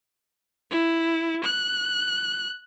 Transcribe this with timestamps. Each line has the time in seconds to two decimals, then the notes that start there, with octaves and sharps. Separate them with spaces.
0.71 E4
1.44 F#6